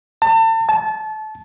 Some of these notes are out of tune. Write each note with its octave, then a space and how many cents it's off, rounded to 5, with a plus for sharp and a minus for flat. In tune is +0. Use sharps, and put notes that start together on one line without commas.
A5 +40
A5 -25